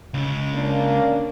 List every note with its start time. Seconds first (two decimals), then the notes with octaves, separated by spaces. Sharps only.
0.14 C#2 C#3
0.54 A#3 C#4 D4